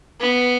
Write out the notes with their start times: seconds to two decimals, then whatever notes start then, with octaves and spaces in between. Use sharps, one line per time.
0.21 B3